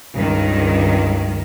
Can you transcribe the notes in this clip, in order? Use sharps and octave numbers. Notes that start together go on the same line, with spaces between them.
C#2 G2 D#3